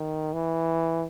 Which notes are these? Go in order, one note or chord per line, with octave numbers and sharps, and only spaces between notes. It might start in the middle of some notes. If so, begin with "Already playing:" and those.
Already playing: D#3
E3